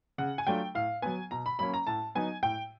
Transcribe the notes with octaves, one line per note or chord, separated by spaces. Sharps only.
C#3 F#5
G#5
F#3 A3 D4 F4 G5
A2 F5
F#3 B3 G#5
B2 A#5
B5
F#3 A#3 C#4 B5
A#5
A2 A5
F#3 B3 D#4 G#5
A2 G5